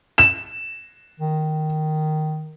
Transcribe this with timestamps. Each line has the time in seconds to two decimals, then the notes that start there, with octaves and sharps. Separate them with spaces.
0.18 E7
1.20 D#3